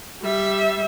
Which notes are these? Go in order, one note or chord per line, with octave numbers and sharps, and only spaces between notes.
G3 E5